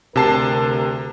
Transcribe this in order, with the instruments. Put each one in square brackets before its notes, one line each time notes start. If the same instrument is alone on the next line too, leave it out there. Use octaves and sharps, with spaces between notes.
[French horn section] D2 A#4 [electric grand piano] C3 A5 C7